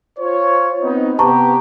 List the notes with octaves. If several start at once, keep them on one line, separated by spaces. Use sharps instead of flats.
F4 C5 C#5
B3 C4 D#4
C3 B3 G4 A5 A#5 C#6